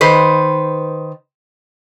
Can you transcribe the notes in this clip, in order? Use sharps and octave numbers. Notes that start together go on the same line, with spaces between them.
D#3 B4 C5